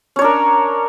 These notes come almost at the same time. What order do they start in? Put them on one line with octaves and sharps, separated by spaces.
C#4 C#5 D4 A#4